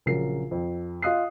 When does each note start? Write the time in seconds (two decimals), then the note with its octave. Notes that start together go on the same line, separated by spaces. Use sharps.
0.06 A#1 C#3 F#3 A#4 C7
0.51 F2
1.02 F4 D#5 F5 D#6 F#6 C7